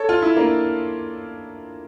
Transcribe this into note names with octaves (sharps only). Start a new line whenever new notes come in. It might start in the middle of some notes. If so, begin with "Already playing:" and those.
Already playing: A4 C#5
F4
E4
A#3 D4